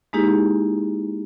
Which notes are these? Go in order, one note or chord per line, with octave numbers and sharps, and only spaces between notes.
G#3 A#3 D#4 E4 G4 G#4